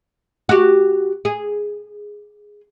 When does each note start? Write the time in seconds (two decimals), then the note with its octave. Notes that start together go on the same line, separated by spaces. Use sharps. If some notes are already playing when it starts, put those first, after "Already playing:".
0.49 F#4 G4
1.25 G#4